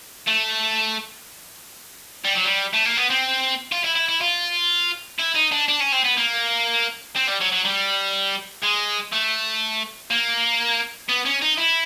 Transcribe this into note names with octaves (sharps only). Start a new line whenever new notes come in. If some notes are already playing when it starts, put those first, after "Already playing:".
A3
G3
F#3
G3
A3
A#3
B3
C4
F4
E4
E4
E4
F4
E4
D#4
D4
D4
C#4
C4
B3
A#3
C4
G3
F#3
F#3
G3
G#3
A3
A#3
B3
C#4
D#4
E4